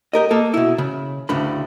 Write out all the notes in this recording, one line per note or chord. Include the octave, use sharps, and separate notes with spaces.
G4 A#4 D#5
A#3 A4 D#5
B2 E4
C#3
D2 A2 C#3 D4 B5